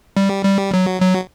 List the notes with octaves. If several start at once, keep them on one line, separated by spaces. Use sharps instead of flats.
G3
G3
F#3
F#3